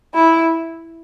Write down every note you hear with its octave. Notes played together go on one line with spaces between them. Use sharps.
E4